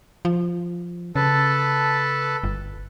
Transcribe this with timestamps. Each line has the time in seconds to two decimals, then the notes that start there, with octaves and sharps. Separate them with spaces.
0.25 F3
1.16 C#3 A4 B4 A5
2.44 G1